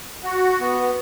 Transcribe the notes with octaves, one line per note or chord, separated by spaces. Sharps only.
F#4
B3